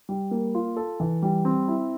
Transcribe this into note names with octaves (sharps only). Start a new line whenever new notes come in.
G3
A#3
F4
A4
E3
G3
C4
E4